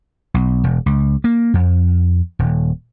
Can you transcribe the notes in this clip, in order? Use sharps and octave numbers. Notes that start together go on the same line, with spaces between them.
B1
E1
C#2
A#3
F2
D#1